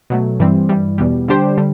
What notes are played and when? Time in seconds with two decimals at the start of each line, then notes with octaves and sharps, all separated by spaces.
0.10 B2 F#3 A3
0.39 G2 E3 G3 C4
0.69 G2 E3 G3
0.98 E2 B2 G3
1.28 D3 G3 D4 G4 C5
1.58 D3 G3